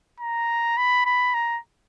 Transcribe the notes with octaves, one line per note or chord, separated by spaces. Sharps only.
A#5
B5
B5
A#5